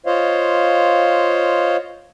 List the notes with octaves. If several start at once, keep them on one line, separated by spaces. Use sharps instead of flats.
F4 C5 C#5 D#5 F5